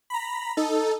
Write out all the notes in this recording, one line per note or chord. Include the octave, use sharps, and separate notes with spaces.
A#5 B5
D#4 A4